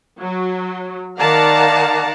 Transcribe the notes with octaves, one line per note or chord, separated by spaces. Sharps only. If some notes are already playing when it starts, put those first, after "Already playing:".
F#3
D#3 D5 F5 F#5 A5 A#5